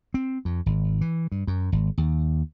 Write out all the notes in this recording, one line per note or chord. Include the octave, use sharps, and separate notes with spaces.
C4
F2
G#1
E3
G2
F#2
G#1
D#2